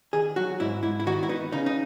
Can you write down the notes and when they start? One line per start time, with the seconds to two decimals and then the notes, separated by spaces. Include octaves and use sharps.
0.13 D#3 G#4
0.36 F#3 F#4
0.60 G#2 E4
0.83 G#2 E4
1.00 E4
1.06 D#3 F#4
1.23 E4
1.29 B3 D#4
1.52 C#3 D#4
1.66 D#4